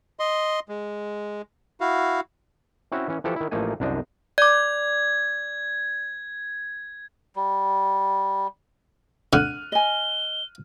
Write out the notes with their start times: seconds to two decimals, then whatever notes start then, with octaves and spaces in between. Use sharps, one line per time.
0.20 D#5 C6
0.69 G#3
1.81 E4 F#4 F5
2.92 C4 C#4 E4 F#4 E5
3.08 E3 C#4
3.24 E3 F3 G4 A4 C5 C#5
3.36 D#3 E4
3.51 A1 F3 A3 A#3 D#4 G#5
3.80 C2 F#2 D4 C5 D#5
4.38 D5 D6 G#6
7.36 G3
9.33 D3 F6 F#6 D#7
9.72 D#5 G#5 G7